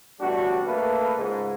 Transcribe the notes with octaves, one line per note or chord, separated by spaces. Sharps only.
A1 B2 G3 D4 F#4
A3 A#3 A4 B4
C#2 G#2